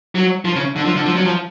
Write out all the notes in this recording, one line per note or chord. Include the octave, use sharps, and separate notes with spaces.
F#3
F3
C#3
D3
F3
D3
F3
F#3
F3